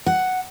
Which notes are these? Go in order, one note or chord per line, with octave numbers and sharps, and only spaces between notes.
F#5